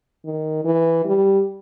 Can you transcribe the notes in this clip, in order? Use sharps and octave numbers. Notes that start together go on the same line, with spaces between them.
D#3
E3
G3